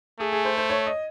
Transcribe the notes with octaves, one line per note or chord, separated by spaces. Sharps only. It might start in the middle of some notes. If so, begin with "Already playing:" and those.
A3 G#4
G#4
C5
C5
C#5
D#5